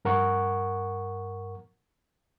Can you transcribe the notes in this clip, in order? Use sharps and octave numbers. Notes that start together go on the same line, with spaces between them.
G2 A#4 F#5 C#6